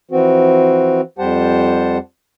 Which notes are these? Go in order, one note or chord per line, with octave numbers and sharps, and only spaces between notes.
E3 F3 C4 F#4
F2 G3 G4 C5 F#5 A5